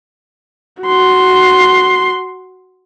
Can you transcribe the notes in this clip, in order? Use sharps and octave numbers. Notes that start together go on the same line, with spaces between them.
F#4 C6